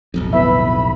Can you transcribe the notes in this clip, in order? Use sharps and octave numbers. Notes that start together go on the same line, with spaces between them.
D1 B1 F2
B3 E4 E5 B5